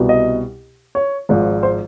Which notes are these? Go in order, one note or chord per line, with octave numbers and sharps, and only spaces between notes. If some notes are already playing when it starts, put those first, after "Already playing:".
Already playing: C2 B2
D#5
C#5
G#1 G#2 F3
C5